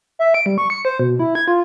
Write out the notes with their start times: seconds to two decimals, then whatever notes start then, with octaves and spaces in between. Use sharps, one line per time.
0.19 E5
0.34 D7
0.46 G3
0.58 C#6
0.70 C#7
0.85 C5
1.00 B2
1.19 E4
1.35 G#6
1.48 F4